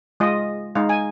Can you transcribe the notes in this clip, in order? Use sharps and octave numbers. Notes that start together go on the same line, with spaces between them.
G#3 F4 D#5
G#3 D#4 F5
G#5